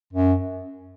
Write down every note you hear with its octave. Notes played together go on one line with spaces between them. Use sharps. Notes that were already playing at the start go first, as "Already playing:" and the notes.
F#2